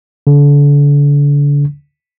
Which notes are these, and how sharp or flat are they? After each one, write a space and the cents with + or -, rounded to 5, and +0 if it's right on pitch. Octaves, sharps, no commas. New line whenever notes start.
D3 -35